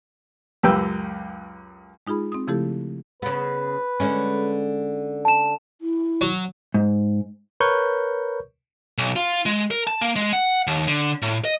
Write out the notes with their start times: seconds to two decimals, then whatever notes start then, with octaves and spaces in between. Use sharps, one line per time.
0.63 C#2 F#2 G4 B4 G5 E6
2.07 G#3 D#4 F4 G#4 B5
2.32 C4 D#6
2.48 C#3 F3 A3 E4 G4 A4
3.22 C#3 B3 B4
4.00 D3 G#3 C#4
5.25 A5 E7
5.81 E4
6.21 F#3
6.74 G#2
7.60 A#4 B4 C#5 C#6 G6
8.98 B1
9.16 F4
9.46 G#3
9.71 A#4
9.87 A5
10.01 A#3
10.16 G#3
10.33 F#5
10.67 D#2
10.88 D3
11.22 A2
11.45 D#5